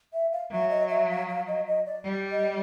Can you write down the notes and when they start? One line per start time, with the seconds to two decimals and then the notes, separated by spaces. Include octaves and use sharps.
0.13 E5
0.32 F5
0.51 F#3 E5
0.70 D#5
0.89 E5
1.09 F5
1.28 F5
1.47 D#5
1.67 D#5
1.86 D5
2.05 G3
2.31 D#5